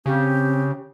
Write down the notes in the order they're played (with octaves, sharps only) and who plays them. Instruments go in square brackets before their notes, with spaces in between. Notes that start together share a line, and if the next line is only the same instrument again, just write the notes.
[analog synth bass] C#3 [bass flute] C4 [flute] G4